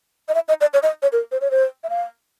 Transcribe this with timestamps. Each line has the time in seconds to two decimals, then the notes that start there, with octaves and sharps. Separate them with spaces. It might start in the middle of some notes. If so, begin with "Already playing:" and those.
0.29 D#5
0.35 E5
0.48 D#5
0.61 D5
0.74 C#5
0.83 D#5
1.02 C#5
1.12 A#4
1.32 C5
1.41 C#5
1.51 C5
1.84 E5
1.90 F5